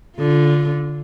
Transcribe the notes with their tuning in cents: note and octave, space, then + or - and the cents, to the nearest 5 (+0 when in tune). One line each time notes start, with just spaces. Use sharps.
D3 -15 F4 +0